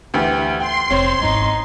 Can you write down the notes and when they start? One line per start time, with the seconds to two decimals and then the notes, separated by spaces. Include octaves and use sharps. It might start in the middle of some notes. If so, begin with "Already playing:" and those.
0.14 D2 E3 G4
0.60 G5 C6
0.91 F1 C4 C#5
1.21 G#1 E2 D#4